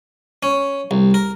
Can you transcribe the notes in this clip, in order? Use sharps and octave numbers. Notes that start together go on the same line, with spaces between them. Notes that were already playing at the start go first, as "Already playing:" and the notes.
C#4
C2
A#4